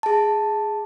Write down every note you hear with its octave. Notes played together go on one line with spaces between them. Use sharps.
G#4 A5